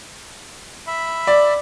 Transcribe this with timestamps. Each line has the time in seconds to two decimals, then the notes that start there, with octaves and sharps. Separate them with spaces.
0.87 E5 B5
1.27 D5